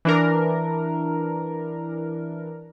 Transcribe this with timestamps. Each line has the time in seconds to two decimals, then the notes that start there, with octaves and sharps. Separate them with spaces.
0.05 E3 D4 A#4